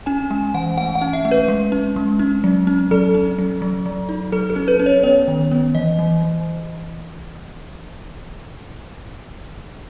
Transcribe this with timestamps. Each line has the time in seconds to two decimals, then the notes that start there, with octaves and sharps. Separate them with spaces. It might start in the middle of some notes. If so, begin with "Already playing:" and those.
0.06 C#4 G#5
0.30 G#3 G#5
0.54 E3 F#5
0.78 A3 F#5
0.95 F#5
1.01 C#4
1.13 E5
1.25 A3
1.31 B4
1.48 G#3
1.72 C#4
1.96 G#3
2.19 C#4
2.44 F#3
2.67 C#4
2.91 F#3 A4
3.15 C#4
3.39 F#3
3.62 F#3
3.86 F#3
4.09 D#4
4.32 F#3 A4
4.50 A4
4.56 C#4
4.68 B4
4.79 C#4
4.86 C#5
5.03 B3 C#5
5.28 D#3
5.51 B3
5.75 E3 D#5
5.99 E3
6.22 E3